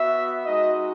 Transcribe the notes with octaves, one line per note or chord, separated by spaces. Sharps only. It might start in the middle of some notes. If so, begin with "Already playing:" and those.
Already playing: B3 F#4 E5
G#3 D#4 F#4 D#5